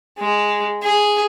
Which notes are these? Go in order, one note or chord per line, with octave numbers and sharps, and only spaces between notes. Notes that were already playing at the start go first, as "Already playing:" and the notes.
G#3
G#4